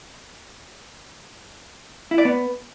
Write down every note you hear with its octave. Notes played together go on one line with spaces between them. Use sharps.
E4
D5
B3